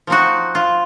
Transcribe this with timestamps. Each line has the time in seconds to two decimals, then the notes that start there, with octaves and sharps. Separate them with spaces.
0.07 F3 C4 D#4 F#4
0.55 F4